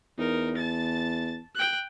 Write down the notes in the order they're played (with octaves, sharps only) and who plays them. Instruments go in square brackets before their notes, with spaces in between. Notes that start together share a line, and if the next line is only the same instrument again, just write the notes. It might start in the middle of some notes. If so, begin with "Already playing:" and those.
[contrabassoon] E2 [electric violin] D#4 A#4
[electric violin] A5 A6
G5 F#6